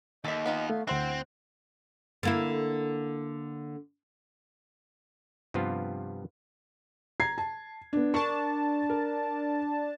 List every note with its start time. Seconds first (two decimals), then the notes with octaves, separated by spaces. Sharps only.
0.24 D#2 A4 D#5 E5 A6
0.46 B3 D#4 F4
0.70 A3 F5
0.87 D2 C4 E4 C5 F#5 F#6
2.23 D3 A#3 E4
5.54 G2 C3 F3 B3 F4
7.20 A#5 G#6 C7
7.38 A5
7.93 B3 D4
8.14 D4 A#4 A5 C#6
8.90 A#4